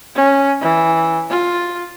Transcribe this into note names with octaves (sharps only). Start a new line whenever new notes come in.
C#4
E3
F4